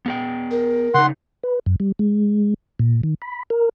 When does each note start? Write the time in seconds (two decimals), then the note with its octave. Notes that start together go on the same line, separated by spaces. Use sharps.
0.06 B3 G#4 G5
0.51 A#4
0.94 C#3 D#4 F#5 C6
1.43 B4
1.66 F#2
1.80 G3
1.99 G#3
2.79 A#2
3.03 D#3
3.22 B5
3.50 A#4